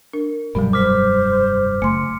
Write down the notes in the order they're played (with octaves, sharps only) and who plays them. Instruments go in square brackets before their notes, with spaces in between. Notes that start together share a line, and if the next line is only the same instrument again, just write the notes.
[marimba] D4 A#4
[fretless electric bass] F1 G2 G3 [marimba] B2 F#3
[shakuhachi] C5 [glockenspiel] D6 F6 B6
[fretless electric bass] F#1 [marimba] A3 C6 [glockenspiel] C#7